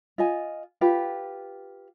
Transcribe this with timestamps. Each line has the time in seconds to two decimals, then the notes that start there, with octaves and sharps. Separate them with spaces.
0.18 F4 D#5 G#5
0.81 F4 G4 B4